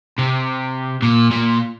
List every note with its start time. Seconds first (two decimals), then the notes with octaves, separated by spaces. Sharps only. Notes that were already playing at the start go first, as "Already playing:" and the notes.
0.18 C3
1.02 A#2
1.31 A#2